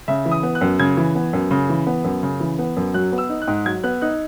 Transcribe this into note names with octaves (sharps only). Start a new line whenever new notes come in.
C#3 E5
E3
D#6
B3
F#6
F#2
C#3 G#6
E3
B3
F#2
C#3
E3
B3
F#2
C#3
E3
B3
F#2
F#3 F#6
B3
E6
D#4
F#6
G#2
F#3 G#6
B3 F#6
D#4 F#6